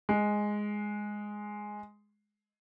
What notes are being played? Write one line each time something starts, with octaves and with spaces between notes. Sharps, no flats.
G#3